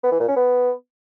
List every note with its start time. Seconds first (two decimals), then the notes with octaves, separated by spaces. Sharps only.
0.03 B3
0.12 E3
0.20 A#2
0.28 C#4
0.36 B3